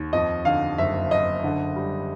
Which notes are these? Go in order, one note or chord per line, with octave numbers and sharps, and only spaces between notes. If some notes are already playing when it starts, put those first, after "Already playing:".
Already playing: D#2
F2 D#5
D3 F5
F#1 E5
F#1 D#5
D3
G3